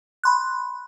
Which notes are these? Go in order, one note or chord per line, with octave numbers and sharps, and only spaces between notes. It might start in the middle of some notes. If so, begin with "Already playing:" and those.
B5 C6 F#6